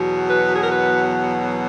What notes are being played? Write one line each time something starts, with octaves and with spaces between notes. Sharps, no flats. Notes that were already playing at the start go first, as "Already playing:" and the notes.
Already playing: E2 B2 F#3
B4
G#4
A#4
B4